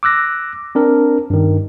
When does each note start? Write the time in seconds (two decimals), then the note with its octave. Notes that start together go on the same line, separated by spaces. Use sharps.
0.03 D6 E6 F#6 A#6
0.75 C4 D4 A#4
1.30 G2 D#3